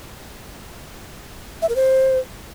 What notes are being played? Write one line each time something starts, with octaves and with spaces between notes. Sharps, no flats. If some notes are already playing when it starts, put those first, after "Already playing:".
E5
A#4
C5